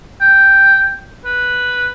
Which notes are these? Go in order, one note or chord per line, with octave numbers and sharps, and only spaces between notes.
G5
B4